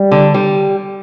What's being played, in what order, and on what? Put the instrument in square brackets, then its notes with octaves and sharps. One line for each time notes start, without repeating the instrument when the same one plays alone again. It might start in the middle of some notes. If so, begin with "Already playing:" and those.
Already playing: [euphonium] G3
[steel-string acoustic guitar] D3
G3